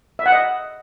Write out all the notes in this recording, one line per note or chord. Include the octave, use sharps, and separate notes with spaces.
E5
F#5
D#5